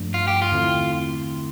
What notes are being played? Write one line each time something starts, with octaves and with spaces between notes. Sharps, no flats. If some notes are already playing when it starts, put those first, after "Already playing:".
Already playing: G2 F3 A3 D4
F4
G4
F4
E2 D3 A3 C4 E4